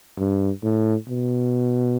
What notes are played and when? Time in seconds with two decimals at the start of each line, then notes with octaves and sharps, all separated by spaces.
0.19 G2
0.63 A2
1.09 B2